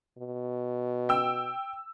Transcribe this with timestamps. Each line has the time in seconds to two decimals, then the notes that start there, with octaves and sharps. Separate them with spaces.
0.18 B2
1.09 G5 E6